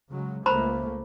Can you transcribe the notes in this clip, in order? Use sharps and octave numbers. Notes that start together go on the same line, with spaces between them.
C#3 F#3 G#3
C#2 A3 A#3 C5 A#5 B5